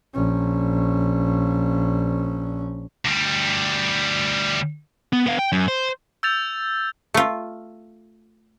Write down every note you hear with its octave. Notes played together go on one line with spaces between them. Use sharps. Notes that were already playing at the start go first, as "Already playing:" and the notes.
A#1 C#4
D2 G3
B3
B3 F5
G5
F#2
C5
E6 G6 A6 F7
A3 F4